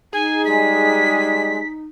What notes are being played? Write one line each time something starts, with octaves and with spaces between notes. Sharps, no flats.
D#4 G#4 G#5
G3 G#3 B6